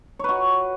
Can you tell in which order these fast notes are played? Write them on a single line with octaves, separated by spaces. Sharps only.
C#5 B4 F#4